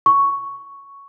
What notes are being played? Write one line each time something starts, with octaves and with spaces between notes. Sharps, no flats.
C#6